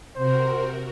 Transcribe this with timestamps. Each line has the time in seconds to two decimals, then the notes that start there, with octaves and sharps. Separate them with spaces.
0.16 C3 F#4 A#4 C5